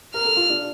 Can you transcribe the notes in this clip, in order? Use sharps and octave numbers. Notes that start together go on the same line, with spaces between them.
A#4 F6
A4
F4
D4